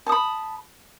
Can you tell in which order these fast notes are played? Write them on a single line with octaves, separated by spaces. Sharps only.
A5 D#6 B5